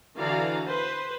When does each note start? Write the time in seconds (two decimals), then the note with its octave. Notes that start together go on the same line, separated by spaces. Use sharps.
0.18 D3 E3 F#4 D5 F5 A#5
0.66 B4 C5